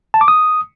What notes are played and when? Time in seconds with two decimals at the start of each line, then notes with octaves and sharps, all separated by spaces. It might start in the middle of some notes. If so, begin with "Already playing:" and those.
0.14 A5
0.21 D6
0.28 D#6